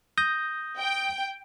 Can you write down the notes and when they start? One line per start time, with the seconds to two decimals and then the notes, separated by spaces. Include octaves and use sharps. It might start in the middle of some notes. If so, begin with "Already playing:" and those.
0.18 D#6 G6 A#6
0.78 G5